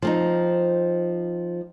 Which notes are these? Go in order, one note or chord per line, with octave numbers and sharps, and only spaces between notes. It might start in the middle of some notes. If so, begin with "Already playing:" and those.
F3 C4 D#4